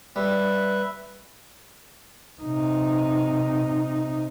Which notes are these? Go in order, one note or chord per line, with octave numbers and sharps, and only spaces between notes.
G3 B4 E5
C3 D#4